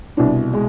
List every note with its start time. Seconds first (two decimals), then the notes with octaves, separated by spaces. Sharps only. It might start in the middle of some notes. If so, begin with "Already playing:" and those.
0.17 C2 B2 D4
0.53 G#3